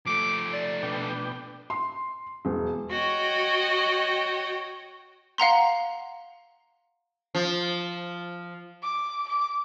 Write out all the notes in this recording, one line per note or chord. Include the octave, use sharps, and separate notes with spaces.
F3 A3 D6
D5
B2 D4 G5
C6
E1
F#4 C#5 D#5 G5
F5 F#5 A#5 C6
F3
D6
D6